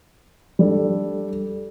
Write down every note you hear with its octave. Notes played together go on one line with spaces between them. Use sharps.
G3 D4 A4